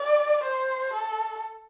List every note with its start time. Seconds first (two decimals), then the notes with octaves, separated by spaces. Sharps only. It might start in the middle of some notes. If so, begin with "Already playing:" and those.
Already playing: D5
0.43 C5
0.93 A4